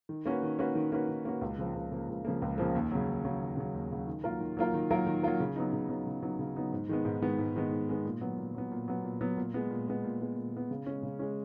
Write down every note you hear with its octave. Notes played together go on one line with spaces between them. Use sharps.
D#3
A#3 C#4 F#4 B4
D#3
A#3 C#4 F#4 B4
D#3
A#3 C#4 F#4 B4
D#3
A#3 C#4 F#4 B4
C#2
C#3 F3 A#3
C#2
C#3 F3 A#3
C#2
C#3 F3 A#3
C#2
C#3 F3 A#3
D#2
C#3 F#3
D#2
C#3 F#3
D#2
C#3 F#3
D#2
C#3 F#3
D#3
F#3 A#3 F4 A#4
D#3
F#3 A#3 F4 A#4
D#3
F#3 A#3 F4 A#4
D#3
F#3 A#3 F4 A#4
C#3
F#3 B3 D#4
C#3
F#3 B3 D#4
C#3
F#3 B3 D#4
C#3
F#3 B3 D#4
G#2
D#3 G#3 B3
G#2
D#3 G#3 B3
G#2
D#3 G#3 B3
G#2
D#3 G#3 B3
A#2
F#3 B3
A#2
F#3 B3
A#2
F#3 B3
A#2
F#3 B3
A#2
G#3 B3
A#2
G#3 B3
A#2
G#3 B3
A#2
G#3 B3
C#3
G#3 C#4
C#3
G#3 C#4